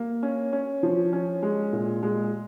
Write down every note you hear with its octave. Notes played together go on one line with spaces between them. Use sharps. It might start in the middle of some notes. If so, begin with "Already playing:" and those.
Already playing: A#3
C#4
C#4
F3
C#4
G#3
A#2
G#3